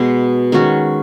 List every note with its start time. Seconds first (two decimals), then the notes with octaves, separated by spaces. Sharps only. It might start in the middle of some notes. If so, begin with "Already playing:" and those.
Already playing: B2 G#3 B3
0.52 D#3 G#3 C#4 F#4